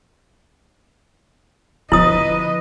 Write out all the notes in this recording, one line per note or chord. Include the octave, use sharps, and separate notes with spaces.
D3 F3 E4 B4 D#5 D#6